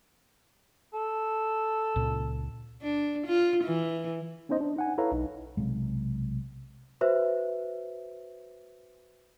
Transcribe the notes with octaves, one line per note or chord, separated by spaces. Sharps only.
A4
C#2 A#2 C#3
D4
F4
E3
B3 C#4 D#4 C5 D#5
D4
D#4 F#5 G#5
E4 A4 B4 C#5 F5 A#5
B1 D#4
B1 C3 G#3
F#4 B4 C5 E5